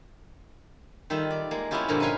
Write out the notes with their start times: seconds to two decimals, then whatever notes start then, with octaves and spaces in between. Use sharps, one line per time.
1.10 D#3 G3 F4 A4 E5
1.30 D5
1.51 G#3 A#3
1.71 G3 B3 C#4 E4 F4 G4
1.88 G2 A#2 D3 F3 A#3 F4
2.00 C#4 D#4 G#4 B4 F5 G#5